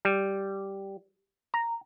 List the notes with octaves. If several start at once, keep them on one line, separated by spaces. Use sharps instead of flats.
G3
A#5